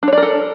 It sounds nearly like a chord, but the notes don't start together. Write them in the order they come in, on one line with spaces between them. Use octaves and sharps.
D4 C#5 D5 A#4 A4